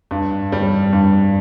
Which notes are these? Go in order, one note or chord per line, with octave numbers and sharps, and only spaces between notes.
G2
G3
G2